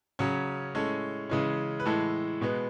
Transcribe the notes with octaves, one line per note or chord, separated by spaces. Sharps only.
C#3 F#3 C#4
A2 G#3 C#4 A4
C#3 E3 G#3 C#4
B4
A2 E3 G#3 A4
B2 G#3 B3